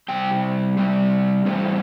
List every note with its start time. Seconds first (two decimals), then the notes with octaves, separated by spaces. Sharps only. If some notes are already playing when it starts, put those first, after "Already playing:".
0.08 C3 G3 C4 G5
0.77 C3 G3 C4
1.45 A2 E3 G3 C4